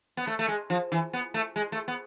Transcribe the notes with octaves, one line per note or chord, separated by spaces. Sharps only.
B3
A3
A3
G#3
F3
E3
B3
A3
G#3
A3
B3